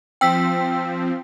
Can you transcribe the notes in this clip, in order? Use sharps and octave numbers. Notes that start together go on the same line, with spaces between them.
F3 C4 G5 E6 B6